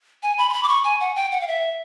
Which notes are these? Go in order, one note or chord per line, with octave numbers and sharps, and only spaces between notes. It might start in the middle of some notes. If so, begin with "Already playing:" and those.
G#5
B5
C6
B5
D6
C#6
G#5
F#5
G5
F#5
F5
E5